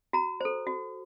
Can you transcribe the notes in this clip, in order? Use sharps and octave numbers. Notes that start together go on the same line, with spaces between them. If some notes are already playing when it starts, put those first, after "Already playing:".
F#4 A#5
A4 C5
F#4